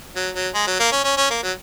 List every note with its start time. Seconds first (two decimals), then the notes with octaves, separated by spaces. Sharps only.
0.16 F#3
0.35 F#3
0.54 G#3
0.67 F#3
0.80 A#3
0.92 C#4
1.04 C#4
1.17 C#4
1.30 A#3
1.43 F#3